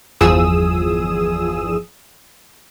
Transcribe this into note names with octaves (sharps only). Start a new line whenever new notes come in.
G1 E2 F3 G#4 D#6 E6